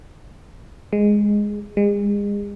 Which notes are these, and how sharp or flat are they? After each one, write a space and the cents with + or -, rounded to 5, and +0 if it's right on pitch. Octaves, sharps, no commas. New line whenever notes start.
G#3 -5
G#3 -35